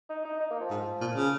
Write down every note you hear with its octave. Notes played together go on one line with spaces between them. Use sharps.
D#4
D#4
D#4
A#3
F3
G#2
A#2
C#3